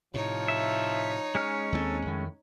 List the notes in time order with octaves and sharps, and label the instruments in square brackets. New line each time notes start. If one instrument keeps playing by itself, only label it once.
[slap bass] A2 C3 [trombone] F3 [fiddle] D#4 C#5
[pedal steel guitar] E5
G#3 C#4 F6
[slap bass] D#2 G3 C4 [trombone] A4
[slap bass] F2 D#3 [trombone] A2